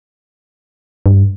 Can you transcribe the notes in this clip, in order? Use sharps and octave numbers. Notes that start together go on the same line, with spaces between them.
G2